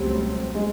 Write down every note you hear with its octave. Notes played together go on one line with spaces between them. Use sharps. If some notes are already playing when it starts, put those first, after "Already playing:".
Already playing: C#2 B2 F#3 G3 A3 C4
G#3